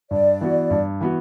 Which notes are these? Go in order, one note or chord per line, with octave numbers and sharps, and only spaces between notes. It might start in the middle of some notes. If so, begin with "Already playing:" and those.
G2 D5
E3 B3 F#4
G2
E3 B3 F#4